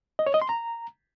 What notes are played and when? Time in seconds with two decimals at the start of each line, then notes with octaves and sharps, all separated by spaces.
0.19 D#5
0.27 C#5
0.34 D#5
0.42 C6
0.49 A#5